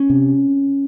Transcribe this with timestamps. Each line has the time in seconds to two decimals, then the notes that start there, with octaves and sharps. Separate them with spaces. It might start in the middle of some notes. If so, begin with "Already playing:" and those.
Already playing: C#4
0.10 C3